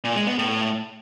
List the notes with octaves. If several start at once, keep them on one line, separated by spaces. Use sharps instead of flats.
A#2
G#3
B3
A2